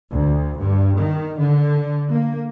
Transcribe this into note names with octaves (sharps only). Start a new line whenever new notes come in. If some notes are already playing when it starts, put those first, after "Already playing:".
D2
G2
D#3
D3
A#3